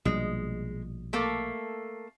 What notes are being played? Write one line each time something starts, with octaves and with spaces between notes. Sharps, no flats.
A#1 B2 G3 G#3
A3 A#3 A4